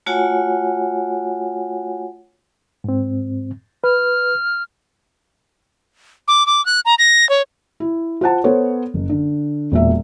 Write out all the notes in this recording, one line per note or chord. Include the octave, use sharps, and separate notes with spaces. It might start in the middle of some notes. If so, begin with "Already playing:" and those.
A3 F4 F#4 C#5 F#5 G#5
G#2 C4
B4 F6
D6
D6
F#6
A#5
A#6
C#5
E4
F4 C5 F#5 A5
B3 A4 C5 C#5
F#1
D3
E1 A#2 E5